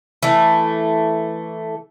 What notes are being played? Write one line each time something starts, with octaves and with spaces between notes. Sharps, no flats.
E3 A3